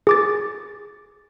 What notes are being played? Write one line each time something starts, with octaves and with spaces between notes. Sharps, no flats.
G#4 D6 A6